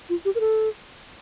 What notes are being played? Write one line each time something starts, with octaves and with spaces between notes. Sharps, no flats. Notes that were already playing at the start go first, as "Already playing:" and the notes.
F4
G4
A#4
A4